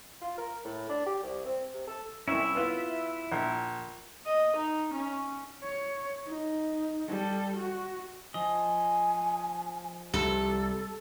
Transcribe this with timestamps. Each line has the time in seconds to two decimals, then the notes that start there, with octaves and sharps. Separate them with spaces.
0.21 F4
0.38 A#4
0.64 A2
0.89 D4
1.06 G4
1.23 C2
1.45 C4
1.73 C3
1.87 A4
2.28 C2 C#4 E4 E5
2.55 B3 F4
3.32 A#1
4.26 D#5
4.56 D#4
4.93 C#4
5.63 C#5
6.26 D#4
7.08 G3 A4
7.57 F#4
8.34 F3 D#5 G#5
10.14 C2 G4 A4